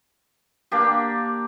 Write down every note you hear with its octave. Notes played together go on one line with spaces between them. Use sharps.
A#3 D4 G4